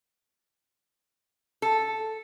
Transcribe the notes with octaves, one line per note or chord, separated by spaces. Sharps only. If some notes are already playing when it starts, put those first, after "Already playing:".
A4